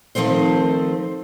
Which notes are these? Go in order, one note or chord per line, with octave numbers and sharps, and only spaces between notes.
D#3 F3 A3 C4 C5